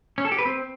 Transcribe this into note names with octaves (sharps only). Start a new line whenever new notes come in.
C#4
A4
G4
B4
C4